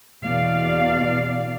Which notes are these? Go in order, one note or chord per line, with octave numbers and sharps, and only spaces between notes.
E2 B2 D5 F5